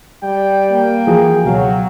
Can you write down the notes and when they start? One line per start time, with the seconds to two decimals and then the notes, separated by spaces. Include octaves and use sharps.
0.24 G3 G5
0.72 A#3
1.07 E3 F3 F#4 G#4
1.45 C#2 B2 F#3 F#4 F5